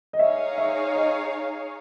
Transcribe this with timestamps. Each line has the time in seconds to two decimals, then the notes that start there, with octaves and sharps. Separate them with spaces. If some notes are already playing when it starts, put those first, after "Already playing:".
0.13 D#5
0.19 D#4 G#4 C#5 E5 F5
0.58 E5
0.95 D#5